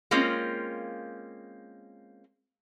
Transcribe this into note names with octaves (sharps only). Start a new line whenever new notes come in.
G#3 A#3 C4 C#4 F4